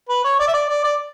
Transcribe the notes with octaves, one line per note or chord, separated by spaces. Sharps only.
B4
C#5
D5
E5
D5
D5
D5